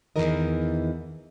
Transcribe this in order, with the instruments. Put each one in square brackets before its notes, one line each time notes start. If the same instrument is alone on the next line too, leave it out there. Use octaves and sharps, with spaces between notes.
[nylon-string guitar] E2 C3 D#3 E3 A#4 D#5